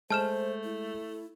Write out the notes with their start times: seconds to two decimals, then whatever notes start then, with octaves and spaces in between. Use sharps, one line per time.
0.10 G#3 A3 C5 A5 F6 G6 E7
0.64 E4